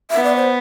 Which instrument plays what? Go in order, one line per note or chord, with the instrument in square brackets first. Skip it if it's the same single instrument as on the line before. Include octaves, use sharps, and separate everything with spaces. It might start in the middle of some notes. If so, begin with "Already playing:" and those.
[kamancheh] B3 [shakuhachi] E5
[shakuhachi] D5
C5